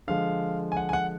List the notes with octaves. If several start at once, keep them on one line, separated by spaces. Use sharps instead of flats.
D3 F3 G#3 F5
G#5
F#5
G#5
F#5